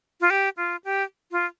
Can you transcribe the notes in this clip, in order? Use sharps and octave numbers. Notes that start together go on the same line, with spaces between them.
F4
G4
F4
G4
F4